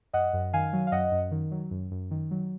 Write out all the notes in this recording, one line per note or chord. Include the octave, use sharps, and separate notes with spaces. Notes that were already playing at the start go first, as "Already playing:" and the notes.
F#2 D#5 F#5
F#2
D#3 F5 G#5
F#3
F5
F#2 D#5 F#5
F#2
D#3
F#3
F#2
F#2
D#3
F#3